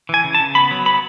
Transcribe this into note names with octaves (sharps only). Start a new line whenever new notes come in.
E3 G#5
C#3
A5
C#3
B3 B5
F#3
B3 B5